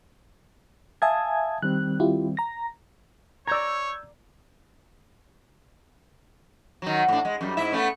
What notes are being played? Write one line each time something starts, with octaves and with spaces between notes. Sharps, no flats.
E5 F5 G#5 A5 D#6 G#6
D#3 G3 C4 F#6
E4 F4 G4
A#5 A#6
C#5 D5 A#5 E6 G6 G#6
D#3 F#3
A2 D4
G#3
F#2 G3
G#2 E4 E5
A3 B3 C#4